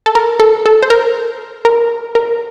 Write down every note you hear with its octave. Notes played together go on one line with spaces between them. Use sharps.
A4
A#4
A4
A4
C5
A#4
A#4
A#4